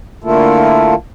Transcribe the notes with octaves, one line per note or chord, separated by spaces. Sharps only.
D3 A3 A#3 E4 F4 A4